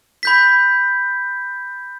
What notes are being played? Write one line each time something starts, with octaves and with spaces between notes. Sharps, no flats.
B5 G6 B6